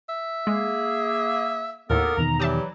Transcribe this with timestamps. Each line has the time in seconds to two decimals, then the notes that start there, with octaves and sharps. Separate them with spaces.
0.09 E5
0.47 G#3 A#3 G#4
1.90 D#2 A2 A#3 B3 A4 A#4
2.17 E2 B2 D#3 A#5
2.40 E3 F#3 G3 G4 E5 A5 D#6